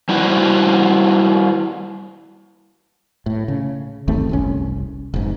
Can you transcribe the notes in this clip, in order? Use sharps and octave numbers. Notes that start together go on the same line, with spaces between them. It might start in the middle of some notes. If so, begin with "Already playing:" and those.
G3 E4 F#4 B4 C5
A2
C#3
G1 D#2 A3 C4
F#1 C2 C#4
F1 G#2